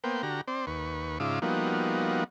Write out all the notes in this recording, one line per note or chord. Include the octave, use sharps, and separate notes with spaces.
A#3 B3 C5 G5
D3 F#4 G4 A#5
C4 C5 D5
D#2 B4 C#6
G#2 C#3 D#4 F4 E5 D6
F3 G3 A#3 B3 D#4 F#4